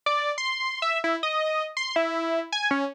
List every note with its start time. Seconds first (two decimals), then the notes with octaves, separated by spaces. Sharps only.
0.06 D5
0.38 C6
0.82 E5
1.04 E4
1.23 D#5
1.77 C6
1.96 E4
2.52 G#5
2.71 C#4